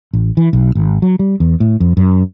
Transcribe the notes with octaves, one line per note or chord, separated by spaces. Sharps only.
A1
E3
B1
G#1
F#3
G3
E2
A2
F2
F#2